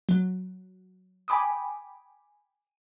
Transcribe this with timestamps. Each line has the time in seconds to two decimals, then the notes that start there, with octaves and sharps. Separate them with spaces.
0.09 F#3
1.28 G5 G#5 B5 D6 D#6